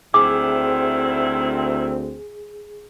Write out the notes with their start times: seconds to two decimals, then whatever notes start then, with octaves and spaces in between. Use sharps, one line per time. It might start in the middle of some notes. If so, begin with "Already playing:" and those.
0.14 D2 D#3 C4 E4 G#4 D6